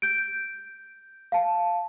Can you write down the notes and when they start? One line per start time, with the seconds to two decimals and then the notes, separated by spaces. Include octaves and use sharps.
0.02 G6 D7
1.32 F5 A5